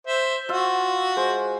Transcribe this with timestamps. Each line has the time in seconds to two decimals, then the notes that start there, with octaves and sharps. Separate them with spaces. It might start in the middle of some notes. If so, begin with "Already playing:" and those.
0.07 C5 E5
0.49 F4 F#4 E5
1.16 G#3 C5